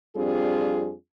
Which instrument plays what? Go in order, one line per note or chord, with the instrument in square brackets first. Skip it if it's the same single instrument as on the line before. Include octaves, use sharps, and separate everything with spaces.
[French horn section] F2 G3 C4 D4 F4 G#4